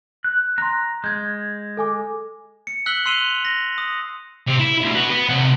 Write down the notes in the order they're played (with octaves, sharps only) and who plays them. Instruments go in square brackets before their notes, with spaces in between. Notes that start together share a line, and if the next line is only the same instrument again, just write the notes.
[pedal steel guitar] F#6
[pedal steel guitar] A#5 [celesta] C6 F#6
[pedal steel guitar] G#3 [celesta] G6 G#6
[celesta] A4 G#5 D6
[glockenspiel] C#7
E6 F#6 B6 F#7 G7
C6 E6 F#6 C7 D#7 F7
A#6
D#6
[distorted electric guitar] C3
E4
D2 B2
F#4 B4
B3
C3 F#5